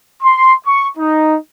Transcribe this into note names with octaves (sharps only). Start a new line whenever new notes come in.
C6
C#6
D#4